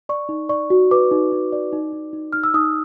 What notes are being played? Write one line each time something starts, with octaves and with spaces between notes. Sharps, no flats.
D5 C#6
D#4
D5 C#6
F#4
B4 D6
D#4
D#4
D5
D#4
D#4
D#4
D#4 F6
E6
D#4 D#6